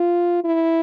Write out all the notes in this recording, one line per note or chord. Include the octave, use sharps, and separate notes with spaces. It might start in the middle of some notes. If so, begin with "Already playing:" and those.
Already playing: F4
E4